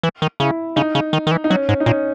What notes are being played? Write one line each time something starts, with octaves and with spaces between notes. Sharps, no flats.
E3
D#3
C#3 E4
C#3 D#4
C#3
D#3
D#3
E3
D#4
F#3 C#4
G#2
D#4
A#2 C#4